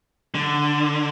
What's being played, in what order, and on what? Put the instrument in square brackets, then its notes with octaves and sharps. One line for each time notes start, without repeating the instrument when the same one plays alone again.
[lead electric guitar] D3